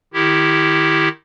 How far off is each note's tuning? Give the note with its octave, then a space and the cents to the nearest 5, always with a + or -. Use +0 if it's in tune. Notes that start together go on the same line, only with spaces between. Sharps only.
D#3 -10 E4 +0 G4 +0